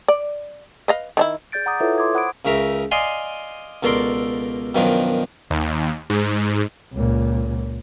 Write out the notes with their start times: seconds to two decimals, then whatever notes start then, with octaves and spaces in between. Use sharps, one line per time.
0.08 D5
0.88 B4 D#5 F5
1.17 D#3 D4 E4
1.52 G#4 D5 G6 A6 D7
1.66 F#5 A#5 D6 D#6
1.80 E4 F4 A4 B4 C#5 E5
1.98 C6 D6 D#6 G#6
2.14 C5 F#5 B5 D#6 G#6 D7
2.45 C#2 C#3 A#4 E5 A#5
2.91 D5 D#5 F5 G#5 C6
3.83 C#2 B2 A4 A#4 D5 C6
4.75 F#2 B2 D#3 F3 D4
5.50 D#2
6.10 G#2
6.93 C#2 A#2